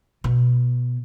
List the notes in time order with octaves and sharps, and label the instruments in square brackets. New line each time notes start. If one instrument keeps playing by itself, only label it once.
[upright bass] B2